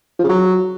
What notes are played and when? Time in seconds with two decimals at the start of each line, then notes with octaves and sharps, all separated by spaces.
0.19 F3
0.24 C#3
0.29 F#3